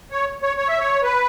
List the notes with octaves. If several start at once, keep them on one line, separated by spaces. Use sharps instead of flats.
C#5
C#5
C#5
E5
C#5
B4